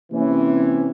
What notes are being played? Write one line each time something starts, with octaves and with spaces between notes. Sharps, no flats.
C3 E3 A#3 C#4